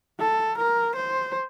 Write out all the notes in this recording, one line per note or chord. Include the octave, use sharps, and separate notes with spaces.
A4
A#4
C5